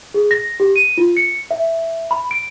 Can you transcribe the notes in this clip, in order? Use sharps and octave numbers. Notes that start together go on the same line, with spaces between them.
G#4
A#6
G4
D#7
F4
C#7
E5
B5
D7